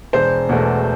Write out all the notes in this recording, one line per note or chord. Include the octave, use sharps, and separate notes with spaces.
E1 C5
E2 B2 A3